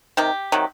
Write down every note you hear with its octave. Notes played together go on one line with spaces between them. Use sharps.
C3 D#3 G4
C3 D#3 F#3